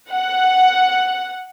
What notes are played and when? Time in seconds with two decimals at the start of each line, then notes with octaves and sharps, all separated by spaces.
0.12 F#5